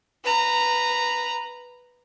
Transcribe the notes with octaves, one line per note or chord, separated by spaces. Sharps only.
B4 A#5